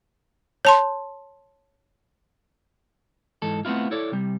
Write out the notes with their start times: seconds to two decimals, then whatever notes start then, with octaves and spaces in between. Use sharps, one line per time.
0.65 C#5 A5 C6
3.42 G#2 E3 A4
3.65 A3 B3 C4 E4 F4
3.91 E4 A4 C#5 D5
4.12 C3 G3